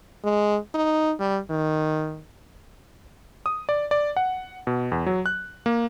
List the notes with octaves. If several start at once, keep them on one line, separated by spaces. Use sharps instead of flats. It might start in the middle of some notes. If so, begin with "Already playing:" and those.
G#3
D#4
G3
D#3
D#6
D5
D5
F#5
B2
E2
F#3
F#6
A#3